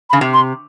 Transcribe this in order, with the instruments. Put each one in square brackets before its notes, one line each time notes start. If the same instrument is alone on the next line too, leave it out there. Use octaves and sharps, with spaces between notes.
[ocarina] B5
[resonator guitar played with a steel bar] C#3
C3
[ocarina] C6